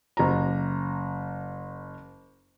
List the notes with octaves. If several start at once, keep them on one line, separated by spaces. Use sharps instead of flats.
F#1 A#5